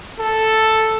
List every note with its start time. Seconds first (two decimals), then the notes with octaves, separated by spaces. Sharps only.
0.19 A4